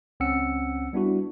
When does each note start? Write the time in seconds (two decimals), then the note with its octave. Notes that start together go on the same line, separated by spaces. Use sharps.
0.20 C#2 C4 C#4 F#5 E6 C#7
0.93 G3 B3 D4 E4 F#4